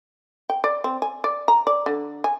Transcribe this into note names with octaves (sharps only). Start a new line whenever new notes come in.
G5
D5
C4
G#5
D5
A#5
D5
D3
G#5